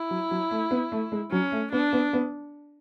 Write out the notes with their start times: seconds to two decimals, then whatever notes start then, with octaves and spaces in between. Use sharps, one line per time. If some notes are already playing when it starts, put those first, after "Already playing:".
Already playing: E4
0.11 F#3
0.31 F#3
0.51 A3
0.71 B3
0.92 A3
1.12 G#3
1.31 F#3 C#4
1.52 A3
1.72 B3 D4
1.93 B3
2.13 B3